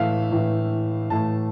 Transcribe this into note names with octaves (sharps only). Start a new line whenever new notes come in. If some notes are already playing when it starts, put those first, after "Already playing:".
Already playing: A2 E3 A3 E5 F5
A2 E3 A3
A2 E3 A3 A5